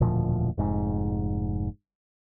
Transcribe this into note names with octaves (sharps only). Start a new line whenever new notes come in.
E1 D2 A#2 F3
F1 G#2